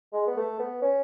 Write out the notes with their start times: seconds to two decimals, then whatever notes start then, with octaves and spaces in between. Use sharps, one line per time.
0.13 G#3
0.27 B3
0.37 A3
0.59 B3
0.82 C#4